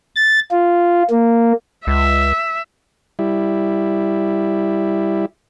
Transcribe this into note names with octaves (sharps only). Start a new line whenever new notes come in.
A6
F4
A#3
C#2 E5
G3 E4